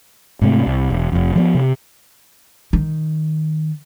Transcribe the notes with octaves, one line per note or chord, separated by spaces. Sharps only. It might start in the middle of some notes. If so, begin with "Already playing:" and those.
G#2 C3 A3
C2
E1
F1 F2
F3 G3 B3
C3
D#3